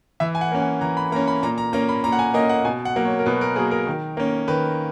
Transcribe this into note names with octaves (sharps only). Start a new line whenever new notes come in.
E3 E5
G#5
F#5
A#3 C#4
G#5
E3 A#5
B5
A#3 C#4 A#5
B5
A#2 A#5
A#5
A#3 C#4 A#5
B5
A#2 A#5
F#5
G#5
A#3 C#4 D#5
F#5
B2 G#5
F#5
F#3 A#3
C#5
A#4
B2 B4
A#4
F#3 A#3 G#4
A#4
D#3
A#3 C#4
D#3 B4